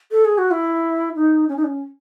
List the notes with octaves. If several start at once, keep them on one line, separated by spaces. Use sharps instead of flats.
A4
G#4
F#4
E4
D#4
C#4
D#4
C#4